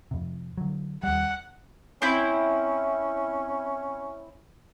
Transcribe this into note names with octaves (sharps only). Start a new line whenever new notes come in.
F2 C3
D3 F#3
D#2 G3 F#5
C4 C#4 E4